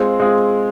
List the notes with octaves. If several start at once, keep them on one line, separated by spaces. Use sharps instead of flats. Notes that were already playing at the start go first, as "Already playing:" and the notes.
Already playing: G#3 C4 F4 G#4
G#3 C4 F4 G#4